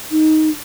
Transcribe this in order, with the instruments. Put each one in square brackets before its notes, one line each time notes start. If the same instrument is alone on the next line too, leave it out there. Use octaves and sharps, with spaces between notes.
[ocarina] D#4